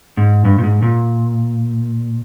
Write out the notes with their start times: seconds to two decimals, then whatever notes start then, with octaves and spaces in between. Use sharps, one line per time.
0.17 G#2
0.45 G2
0.58 A#2
0.63 G#2
0.82 A#2